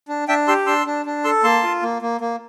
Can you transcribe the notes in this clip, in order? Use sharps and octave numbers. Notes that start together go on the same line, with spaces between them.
D4
D4 E5 G5
G4 C6 E6
D4 C6 E6
D4
D4
A4 C6 E6
A#3 A5 C6
F4
A#3
A#3
A#3